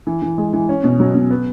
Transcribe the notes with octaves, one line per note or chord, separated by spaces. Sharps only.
E3
E3
G#3
E3
C#4
B2
F#3
B2
B3